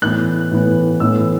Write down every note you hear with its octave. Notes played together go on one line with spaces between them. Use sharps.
A2 E3 B3 F#6
A2 E3 B3
A2 E3 B3 E6